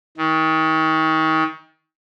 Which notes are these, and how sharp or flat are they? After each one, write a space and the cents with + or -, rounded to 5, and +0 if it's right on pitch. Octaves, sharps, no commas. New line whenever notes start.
D#3 +35